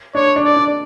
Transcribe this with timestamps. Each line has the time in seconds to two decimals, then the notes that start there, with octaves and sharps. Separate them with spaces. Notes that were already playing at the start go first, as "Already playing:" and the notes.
0.15 D4 C#5
0.36 D4
0.44 D5
0.56 D4